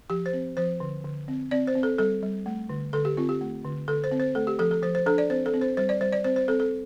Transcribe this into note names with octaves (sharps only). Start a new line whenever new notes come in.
F3 G4
C5
C4
F3 C5
D3
D3
C4
C4 D5
C5
C4
A4
G3 A4
G3
A3
D3
D3 A4
G4
C4 F4
G4
A3
D3
D3 A4
C5
C4
C5
A3 A4
G4
F3 A4
A4
F3 C5
C5
D4 A4
D5
C4 C5
A4
C4
C5
G3 C5
D5
G3 C5
D5
C4 C5
C5
C4 A4
A4